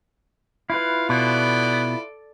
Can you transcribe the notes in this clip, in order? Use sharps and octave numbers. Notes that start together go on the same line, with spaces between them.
E4 F4 B4 F5
B2 B3 A4 D5